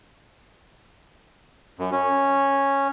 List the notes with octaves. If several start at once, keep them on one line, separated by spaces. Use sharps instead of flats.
F#2
C#4